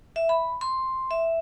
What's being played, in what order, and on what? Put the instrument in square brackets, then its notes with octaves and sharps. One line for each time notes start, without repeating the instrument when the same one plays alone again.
[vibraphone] E5
B5
C6
E5